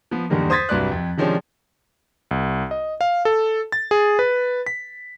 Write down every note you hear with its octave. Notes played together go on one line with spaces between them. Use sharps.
F3 B3
E2 G2 D3 D#3 G3 A#3
C5 D#6 G#6 A6 B6
C2 G2 F#3 B4 D5 F#6
F2
C3 D#3 F3 G#3 C#4 D4
C2
D#5
F5
A4
A6
G#4
B4
B6